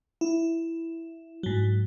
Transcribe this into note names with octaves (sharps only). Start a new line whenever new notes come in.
E4
G#2 F#3